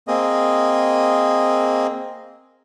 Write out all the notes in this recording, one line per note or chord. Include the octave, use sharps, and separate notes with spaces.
A#3 C4 G#4 D#5